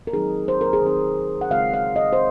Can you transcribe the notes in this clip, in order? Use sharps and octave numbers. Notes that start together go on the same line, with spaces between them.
A#4
D#3 F#3 C4 D#4 G#4
C5
A#4
G#4
D#3 F#3 C4 D#4 A#4
F#5
C#3 G#3 C4 F5
F5
D#5
C5